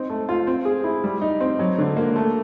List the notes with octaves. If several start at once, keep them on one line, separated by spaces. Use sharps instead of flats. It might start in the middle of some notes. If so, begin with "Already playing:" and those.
Already playing: C4 D#4
A3
F4
C4
G#4
E4
G3
D#4
C4
F#3
D3
A#3
A3